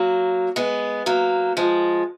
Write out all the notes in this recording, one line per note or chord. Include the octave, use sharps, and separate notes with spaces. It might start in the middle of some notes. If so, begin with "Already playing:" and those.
Already playing: F#3 A#3
G#3 B3
F#3 A#3
F3 G#3